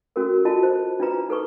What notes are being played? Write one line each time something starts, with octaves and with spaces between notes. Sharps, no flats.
C#4 F#4 A4 A#4
D4 F4 F#4 D#5 A5
C5
D4 E4 F4 B4 A#5
D#4 A4 B4 C#6